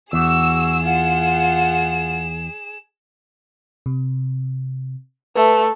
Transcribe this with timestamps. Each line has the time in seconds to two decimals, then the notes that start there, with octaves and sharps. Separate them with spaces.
0.13 E2 F#4 G#4 E6 E7
0.84 F4 F#5
3.86 C3
5.36 A3 B4 E5